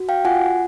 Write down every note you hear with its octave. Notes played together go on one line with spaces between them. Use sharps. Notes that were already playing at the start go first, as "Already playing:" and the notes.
Already playing: F#4
F5 G5
F4 F#5 G#5